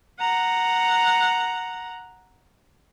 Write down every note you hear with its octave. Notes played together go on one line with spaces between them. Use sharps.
F#5 A#5